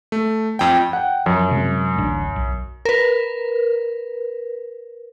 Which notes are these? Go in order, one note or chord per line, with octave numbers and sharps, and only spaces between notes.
A3
F2 G5
F#5 G5
F#2 F3 C#4
C3 F#3 G#3
D1 A1 D4
B1
A#4 B4